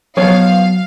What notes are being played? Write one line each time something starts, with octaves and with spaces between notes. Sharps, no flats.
F3 F#3 B3 C#5 F5